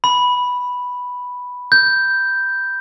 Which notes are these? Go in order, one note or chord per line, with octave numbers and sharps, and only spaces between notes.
B5
G6